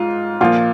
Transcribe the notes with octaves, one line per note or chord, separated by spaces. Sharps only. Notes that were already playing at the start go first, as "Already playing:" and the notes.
Already playing: G#2 F4
A#2 F3 F4